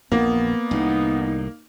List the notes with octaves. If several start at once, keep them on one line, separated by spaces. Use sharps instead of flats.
A#1 E2 A#3 B3
C2 A2 D#4